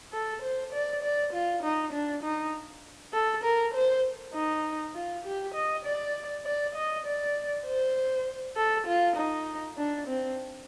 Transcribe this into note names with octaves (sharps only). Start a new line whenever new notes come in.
A4
C5
D5
D5
F4
D#4
D4
D#4
A4
A#4
C5
D#4
F4
G4
D#5
D5
D5
D#5
D5
C5
A4
F4
D#4
D4
C4